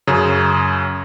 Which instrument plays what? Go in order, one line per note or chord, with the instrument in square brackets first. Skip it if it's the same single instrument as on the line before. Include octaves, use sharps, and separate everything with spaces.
[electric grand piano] F#2 C#3